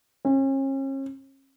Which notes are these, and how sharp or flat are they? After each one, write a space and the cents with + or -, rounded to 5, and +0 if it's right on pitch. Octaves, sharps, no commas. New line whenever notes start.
C#4 -40